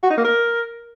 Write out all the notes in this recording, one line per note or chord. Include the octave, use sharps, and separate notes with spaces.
F#4
D#4
A#3
A#4